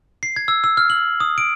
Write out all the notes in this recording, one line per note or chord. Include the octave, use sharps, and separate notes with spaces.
C7
G#6
E6
E6
F6
F#7
D#6
D7